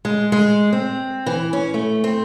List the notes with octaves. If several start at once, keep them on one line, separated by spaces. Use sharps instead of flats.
G#3
G#3
C4
E3
C#4
A3
C4